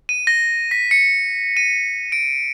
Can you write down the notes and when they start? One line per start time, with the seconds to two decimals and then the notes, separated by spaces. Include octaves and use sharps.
0.09 D#7
0.27 A#6
0.71 B6
0.91 C#7
1.57 D#7
2.12 D7